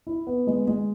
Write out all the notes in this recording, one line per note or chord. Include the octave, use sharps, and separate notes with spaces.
E4
B3
G#3
G#3